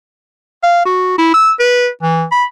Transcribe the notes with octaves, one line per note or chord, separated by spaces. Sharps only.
F5
F#4
E4
E6
B4
E3
B5